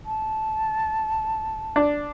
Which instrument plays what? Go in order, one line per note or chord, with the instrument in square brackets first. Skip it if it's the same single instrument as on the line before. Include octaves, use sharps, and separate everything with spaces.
[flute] A5
[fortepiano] D4